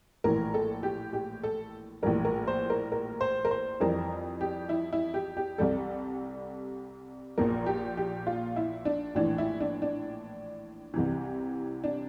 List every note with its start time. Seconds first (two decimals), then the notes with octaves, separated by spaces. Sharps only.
0.24 A#1 A2 E3 A#4
0.54 A4
0.83 G4
1.13 G4
1.43 A4
2.02 A#1 A2 E3 G3 A#4
2.25 A#4
2.47 C5
2.70 A#4
2.92 A#4
3.21 C5
3.45 A#4
3.51 C5
3.80 F2 E3 G3 A#4
4.41 G4
4.69 E4
4.93 E4
5.14 G4
5.37 G4
5.58 C2 C3 G3 A4
7.38 A#1 A#2 F3 A#4
7.66 G4
7.97 G4
8.27 F4
8.56 E4
8.85 D4
9.15 A#1 A2 E3 D4
9.38 E4
9.60 D4
9.82 D4
10.94 C2 C3 E3
11.84 D4